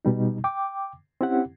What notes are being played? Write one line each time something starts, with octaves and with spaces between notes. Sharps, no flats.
B2 G3 D#4
G5 D6
C4 C#4 E4 G4 F#5